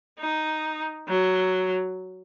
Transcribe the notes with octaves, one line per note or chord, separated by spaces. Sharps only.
D#4
F#3